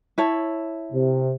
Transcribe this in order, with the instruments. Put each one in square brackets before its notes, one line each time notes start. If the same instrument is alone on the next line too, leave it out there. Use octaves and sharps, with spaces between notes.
[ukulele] E4 C#5 A5
[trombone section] C3